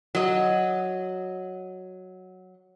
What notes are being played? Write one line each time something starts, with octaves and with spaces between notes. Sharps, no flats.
F#3 D#5